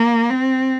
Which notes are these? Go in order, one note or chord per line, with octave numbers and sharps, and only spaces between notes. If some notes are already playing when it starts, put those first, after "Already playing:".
Already playing: A#3
C4